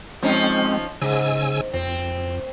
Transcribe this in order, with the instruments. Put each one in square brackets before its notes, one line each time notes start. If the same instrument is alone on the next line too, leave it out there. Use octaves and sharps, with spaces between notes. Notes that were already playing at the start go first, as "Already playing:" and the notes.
[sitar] F3 C#4 D#4 [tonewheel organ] G#3 C4
[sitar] G#2 [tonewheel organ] C#3 G#5 E6
[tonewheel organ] F2 [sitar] C4